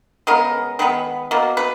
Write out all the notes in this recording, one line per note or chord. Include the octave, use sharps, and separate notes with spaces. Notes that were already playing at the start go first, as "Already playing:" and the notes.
C#3 G#3 B3 A#4
D#3 G#3 B3 B4
B2 A#3
B4